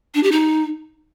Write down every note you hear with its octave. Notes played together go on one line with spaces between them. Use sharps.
D4
G4
D#4